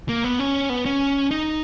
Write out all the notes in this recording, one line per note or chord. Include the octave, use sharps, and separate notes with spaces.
A#3
B3
C#4
B3
C#4
D#4